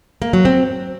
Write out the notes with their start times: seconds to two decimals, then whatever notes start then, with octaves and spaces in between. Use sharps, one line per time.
0.22 A#3
0.33 F#3
0.45 C4